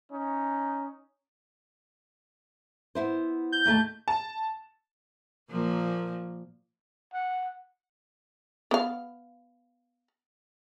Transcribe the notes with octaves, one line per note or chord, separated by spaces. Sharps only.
C#4 D#4
B3 E4 C5
G6
D#2 A3 A5
A5
A#2 F3 A#3
F#5
B3 F5